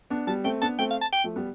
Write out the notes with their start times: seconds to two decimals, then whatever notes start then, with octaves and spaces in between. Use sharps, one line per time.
0.10 B3 D4
0.27 G3 B3 A5
0.44 A3 C4 G5
0.62 B3 D4 A5
0.79 A3 C4 G5
0.91 F5
1.01 A5
1.13 G5
1.24 F3 A3
1.36 G3 B3